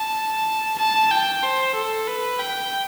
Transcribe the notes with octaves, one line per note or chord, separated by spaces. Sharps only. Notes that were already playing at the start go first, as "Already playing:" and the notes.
Already playing: A5
A5
G5
C5
A4
B4
G5